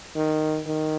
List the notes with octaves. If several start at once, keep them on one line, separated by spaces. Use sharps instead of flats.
D#3
D#3